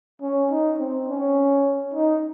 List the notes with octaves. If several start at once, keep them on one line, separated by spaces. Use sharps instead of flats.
C#4
D#4
C4
C#4
D#4